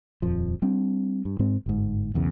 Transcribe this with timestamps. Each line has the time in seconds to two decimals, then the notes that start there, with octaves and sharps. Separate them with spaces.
0.22 D#1 F2 F3
0.62 G3 C4 D4
1.25 G2
1.39 G#2 G#3 C4
1.66 G1 G#2
2.14 B1 E2 C#3